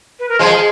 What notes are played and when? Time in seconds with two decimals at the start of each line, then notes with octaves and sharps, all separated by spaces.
0.19 B4
0.29 A#4
0.39 F3 G#3 G#4